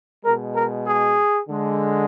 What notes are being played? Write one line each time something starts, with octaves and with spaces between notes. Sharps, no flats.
B2 G#3 A#4
A#4
G#4
D3 G#3